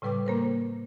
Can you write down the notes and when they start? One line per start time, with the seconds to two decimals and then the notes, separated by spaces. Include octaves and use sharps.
0.02 A2 C#3 G3 B4 G5 D6
0.26 A#3 A#4 C5